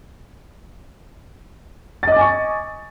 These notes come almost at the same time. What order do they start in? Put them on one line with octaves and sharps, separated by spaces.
A6 D#5 D6 G#5 C#6